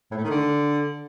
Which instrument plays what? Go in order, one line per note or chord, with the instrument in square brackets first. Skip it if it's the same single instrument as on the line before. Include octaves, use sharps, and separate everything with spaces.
[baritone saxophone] A2
A3
D#3
D3